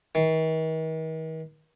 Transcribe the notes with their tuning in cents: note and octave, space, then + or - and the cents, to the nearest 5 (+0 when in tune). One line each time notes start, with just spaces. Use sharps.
D#3 +45